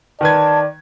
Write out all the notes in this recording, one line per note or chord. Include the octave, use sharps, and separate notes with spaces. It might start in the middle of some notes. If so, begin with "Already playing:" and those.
D#3 B4 D5 A5 G#6